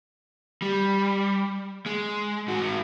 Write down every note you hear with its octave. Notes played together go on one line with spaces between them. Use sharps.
G3
G#3
G#2 F#4